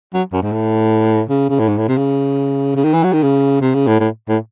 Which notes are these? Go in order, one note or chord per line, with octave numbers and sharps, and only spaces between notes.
F#3
F#2
G#2
A2
C#3
C#3
A2
G#2
A2
C3
C#3
C#3
D#3
E3
F#3
D#3
C#3
C3
C#3
A2
A2
A2